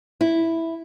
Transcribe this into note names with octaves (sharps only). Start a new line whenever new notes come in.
E4